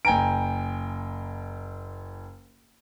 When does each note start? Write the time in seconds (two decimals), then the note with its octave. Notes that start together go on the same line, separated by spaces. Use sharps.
0.05 F#1 G5 G#5 A#5 D7